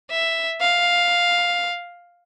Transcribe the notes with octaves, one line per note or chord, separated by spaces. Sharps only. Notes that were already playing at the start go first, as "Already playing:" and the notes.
E5
F5